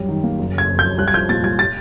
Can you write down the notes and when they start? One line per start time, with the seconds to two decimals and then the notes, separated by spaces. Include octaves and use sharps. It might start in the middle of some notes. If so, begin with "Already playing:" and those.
Already playing: F#2 G3
0.09 D#3
0.24 A#3
0.39 F#1
0.54 C#3 G#6
0.69 F2
0.79 G6
0.84 F#3
0.98 C2 F#6
1.08 G#6
1.14 F3 G6
1.29 A#2 A6
1.44 C2 G#6
1.59 A6